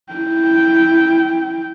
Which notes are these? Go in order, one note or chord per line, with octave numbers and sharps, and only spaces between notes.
E4 G5